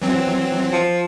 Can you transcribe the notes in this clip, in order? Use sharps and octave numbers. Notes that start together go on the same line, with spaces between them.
E3 F#3 C4
F3